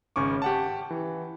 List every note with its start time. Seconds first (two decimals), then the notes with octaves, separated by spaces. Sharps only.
0.16 G#1 C#3 C#4 C#6 D6
0.42 G4 F#5 A5
0.91 E3